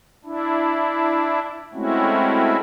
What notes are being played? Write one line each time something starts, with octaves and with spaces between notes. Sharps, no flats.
D4 E4
G#3 A3 C4 C#4 E4 F#4